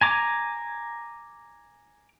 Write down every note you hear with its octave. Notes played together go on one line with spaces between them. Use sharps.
G#5 A#5 D6